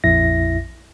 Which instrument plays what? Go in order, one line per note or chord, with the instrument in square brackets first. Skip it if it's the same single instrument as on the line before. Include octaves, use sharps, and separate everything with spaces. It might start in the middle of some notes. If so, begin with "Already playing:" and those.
[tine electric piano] A#1 F2 E4 E5 A#6